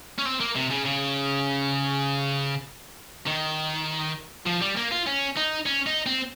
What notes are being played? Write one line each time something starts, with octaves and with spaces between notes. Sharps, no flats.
C#4
C4
A#3
C3
C#3
C#3
D#3
F3
G3
A#3
F4
C#4
D#4
C#4
D#4
C4